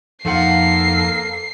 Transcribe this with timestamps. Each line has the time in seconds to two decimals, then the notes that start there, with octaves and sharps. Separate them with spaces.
0.25 F2 F3 A#3 D#4 F4 A4 F#5 C7